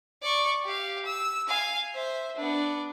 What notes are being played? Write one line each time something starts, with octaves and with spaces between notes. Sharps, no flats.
D5 C#6
G4 F5
E6
F5 G#5
C5 E5
B3 D4